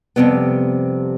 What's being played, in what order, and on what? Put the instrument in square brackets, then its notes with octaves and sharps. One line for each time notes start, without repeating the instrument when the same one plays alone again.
[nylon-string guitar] F2 C3 G3 B3